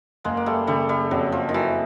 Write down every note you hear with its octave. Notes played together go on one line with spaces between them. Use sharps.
F#1 G#3 A#3
A#3
G3 A3
C#3 G3 A3
G3
F2 F#3
F3
D#3
E3 F#3